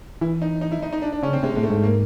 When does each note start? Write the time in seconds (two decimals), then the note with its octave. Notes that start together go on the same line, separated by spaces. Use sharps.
0.21 E3 E4
0.42 D#4
0.61 D#4
0.71 E4
0.82 D#4
0.93 D#4
1.02 D4
1.12 D4
1.23 C#3 C#4
1.33 C4
1.43 C3 G#3
1.55 A2 G#3
1.63 A3
1.70 G#2
1.83 A#3